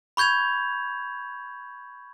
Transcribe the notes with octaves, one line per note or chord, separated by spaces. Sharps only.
B5 C#6 G6 G#6 F7